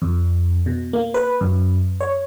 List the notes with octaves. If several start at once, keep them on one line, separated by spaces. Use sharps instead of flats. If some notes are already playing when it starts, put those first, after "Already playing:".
F2
B2
A#3
B4
F#2
C#5